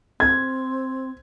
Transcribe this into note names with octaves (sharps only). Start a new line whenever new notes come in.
C4 G#6